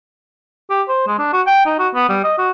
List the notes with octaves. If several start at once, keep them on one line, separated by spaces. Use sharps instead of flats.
G4
C5
G#3
D4
F#4
G5
D#4
F#4
B3
G3
D#5
F#4